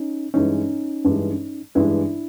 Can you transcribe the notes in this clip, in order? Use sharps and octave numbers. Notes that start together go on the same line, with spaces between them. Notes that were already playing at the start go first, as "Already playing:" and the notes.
Already playing: C#4 D#4
G2 E3 G#3 C#4 D#4
G2 E3 G#3
G2 E3 G#3 D4 E4